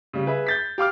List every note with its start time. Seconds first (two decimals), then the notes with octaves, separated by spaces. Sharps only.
0.13 C#3 G3
0.26 G#4 B4 E5
0.47 G6 A6 B6
0.78 G4 F5 D6 F6